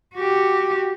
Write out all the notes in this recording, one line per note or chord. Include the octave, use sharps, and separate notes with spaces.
F#4 G4